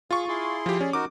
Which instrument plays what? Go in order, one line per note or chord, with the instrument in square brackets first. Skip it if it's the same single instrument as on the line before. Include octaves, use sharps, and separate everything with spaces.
[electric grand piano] F4 C#6 [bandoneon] G#4
[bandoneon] E4 G#4 C6
[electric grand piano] F3 G4
[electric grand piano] C#4 [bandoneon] G#4 D5
[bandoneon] D#4 F#4 A#4 [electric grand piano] D6